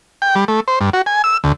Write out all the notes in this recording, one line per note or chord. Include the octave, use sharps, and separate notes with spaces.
G5
G3
A3
C5
G2
F#4
G#5
E6
D2